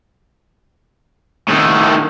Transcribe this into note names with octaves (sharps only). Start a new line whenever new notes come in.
A2 D#3